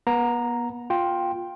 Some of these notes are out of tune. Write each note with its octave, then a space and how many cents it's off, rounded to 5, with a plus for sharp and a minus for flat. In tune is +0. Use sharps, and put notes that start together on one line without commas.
B3 -35 A#5 +0
F4 +10 G5 +0